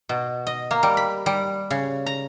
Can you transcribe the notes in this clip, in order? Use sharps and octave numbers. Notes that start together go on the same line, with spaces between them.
B2
D#5
A#3
G3
B5
G3
C#3
A#5